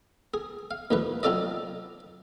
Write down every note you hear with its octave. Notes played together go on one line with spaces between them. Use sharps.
G#4
F5
D#2 A2 F3 B4
F#3 C4 F4 A4 D5 D#5